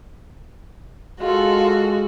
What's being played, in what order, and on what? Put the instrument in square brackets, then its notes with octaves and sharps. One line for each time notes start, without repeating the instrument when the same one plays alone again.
[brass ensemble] G#3 [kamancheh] F4 A4 [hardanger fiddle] F#4